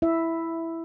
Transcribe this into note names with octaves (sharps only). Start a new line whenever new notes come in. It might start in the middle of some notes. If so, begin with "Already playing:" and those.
E4 E5